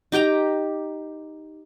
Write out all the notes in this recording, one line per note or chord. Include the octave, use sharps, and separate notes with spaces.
D#4 G4 G5 A#5